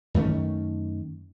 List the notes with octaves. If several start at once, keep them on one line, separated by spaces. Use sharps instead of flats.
F#2 D#3 A3 C#4